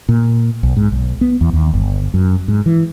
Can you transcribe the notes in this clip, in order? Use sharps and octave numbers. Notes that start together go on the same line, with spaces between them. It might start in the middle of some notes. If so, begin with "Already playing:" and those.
A#2
B1
G#2
B1
B3
E2
D#2
G1
F#2
G#2
E3